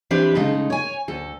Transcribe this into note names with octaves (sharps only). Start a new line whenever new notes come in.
E3 C4 D4 G4 B4
C#3 G#3 A3 D#4
C#5 G#5
D2 A4